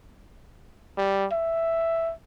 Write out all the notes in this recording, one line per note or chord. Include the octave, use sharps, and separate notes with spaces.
G3
E5